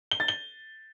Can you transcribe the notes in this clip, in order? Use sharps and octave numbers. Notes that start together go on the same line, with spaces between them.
G7
A6
G7